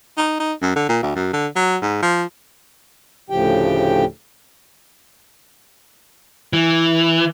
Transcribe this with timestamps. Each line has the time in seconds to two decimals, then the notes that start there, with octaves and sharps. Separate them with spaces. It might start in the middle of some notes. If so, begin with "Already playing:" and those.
0.17 D#4
0.39 D#4
0.61 F#2
0.75 D3
0.89 A#2
1.03 D2
1.15 F#2
1.33 D3
1.56 F#3
1.82 G#2
2.02 F3
3.30 D2 A2 C#3 F3 G4 G5
6.53 E3